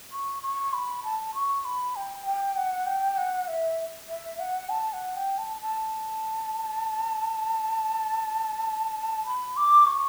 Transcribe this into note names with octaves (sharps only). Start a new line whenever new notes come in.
C#6
C#6
B5
A5
C#6
B5
G5
G5
F#5
G5
F#5
E5
E5
F#5
A5
F#5
G5
A5
A5
B5
D6
C#6